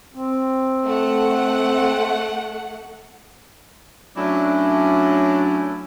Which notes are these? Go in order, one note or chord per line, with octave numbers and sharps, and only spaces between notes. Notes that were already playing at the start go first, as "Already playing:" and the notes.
C4
A3 F#5
F#3 A3 C#4 D4 E4